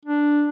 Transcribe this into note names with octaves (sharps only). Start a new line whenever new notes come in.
D4